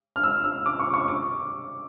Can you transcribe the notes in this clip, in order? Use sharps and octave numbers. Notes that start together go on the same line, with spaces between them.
F6
E6
E6
D6
C#6
C#6
D6